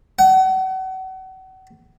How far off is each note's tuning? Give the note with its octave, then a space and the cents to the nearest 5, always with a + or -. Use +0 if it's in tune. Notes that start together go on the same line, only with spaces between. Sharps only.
F#5 +35